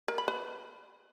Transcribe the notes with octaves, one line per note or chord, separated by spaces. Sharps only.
A#4
B5
B4